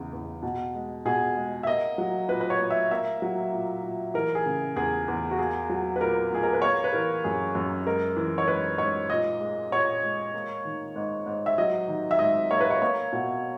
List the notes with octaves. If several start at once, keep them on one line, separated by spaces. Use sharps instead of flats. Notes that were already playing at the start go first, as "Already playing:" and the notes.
Already playing: E2 C#3
E2
B2
G#3
B2 G#4
G#3
E5
A#3 D#5
F#3
A#2 B4
B4
C#5
A#2
E5
A#3 E5
F#3
A#2
A#2
E3 A#4
G#4
C#3
E2 G#4
E2
F#4
A#3 G#4
F#3
B4
A#2 A#4
A#2 G#4
A#4
B4
A#3 C#5
B4
E3 A#4
F#2 G#4
F#2
G#3 A#4
E3
C#5
G#2 B4
G#2 C#5
A#2 D#5
G#3
A#2 C#5
G#3
A#3
D#3
G#2
G#2
E5
F#3 D#5
D#3
E5
G#2 D#5
A#3 C#5
B4
C#5
A#3 C#5
B2